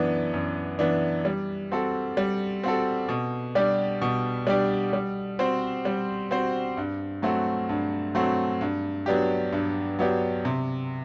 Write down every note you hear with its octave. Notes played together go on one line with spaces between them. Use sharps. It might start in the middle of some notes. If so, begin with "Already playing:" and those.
Already playing: F#2 E3 B3 D4
F#2
E3 B3 D4
G3
C4 F#4 A4
G3
C4 F#4 A4
B2
G3 D4 G4 D5
B2
G3 D4 G4 D5
G3
C4 F#4 C5
G3
C4 F#4 C5
G2
F#3 A3 C4 F#4
G2
F#3 A3 C4 F#4
G2
F#3 B3 D4 G4
G2
F#3 B3 D4 G4
C3